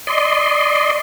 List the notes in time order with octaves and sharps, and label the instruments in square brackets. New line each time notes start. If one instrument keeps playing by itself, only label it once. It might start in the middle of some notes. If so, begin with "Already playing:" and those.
[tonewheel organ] D5 D#5 C6